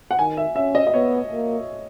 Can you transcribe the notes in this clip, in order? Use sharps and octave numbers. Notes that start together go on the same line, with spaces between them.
F#5
D#3 G#5
E5
C#4 E5
D#5
D#5
B3 C#5
A#3